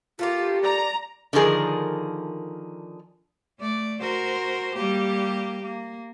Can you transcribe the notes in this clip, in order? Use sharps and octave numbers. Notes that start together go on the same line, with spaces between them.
A3 A#3 F4 G4
D5 A#5
D3 D#3 F3 G#4 A#4
A3 D5
F#4 A#4 C5
G3 A#3 G4
A#3